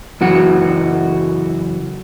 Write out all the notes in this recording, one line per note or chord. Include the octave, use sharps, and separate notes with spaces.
F#2 C#3 E3 F#4